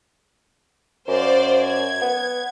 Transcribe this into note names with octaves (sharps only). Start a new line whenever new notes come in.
F#2 C5 D5 F5
G#6
B3